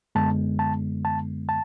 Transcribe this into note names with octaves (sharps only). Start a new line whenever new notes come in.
F#2 D3 G#3 B3 A5
A5
A5
A5